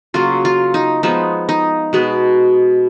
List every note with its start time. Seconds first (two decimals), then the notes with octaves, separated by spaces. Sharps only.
0.14 C#3 F#3 A#3 F4
0.45 F4
0.74 D#4
1.03 F3 G#3 B3 D#4
1.49 D#4
1.93 B2 G#3 B3